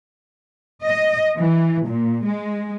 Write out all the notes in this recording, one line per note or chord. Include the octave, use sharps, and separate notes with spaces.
D#5
E3
A#2
G#3